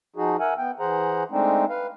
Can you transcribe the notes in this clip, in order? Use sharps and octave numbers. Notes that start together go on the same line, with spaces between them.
F3 D#4 F#4 G#4
A#4 E5 F#5 G#5
B3 G5
E3 G#4 C5 F#5 A#5
G#3 A3 C4 D4 D#4
B4 F5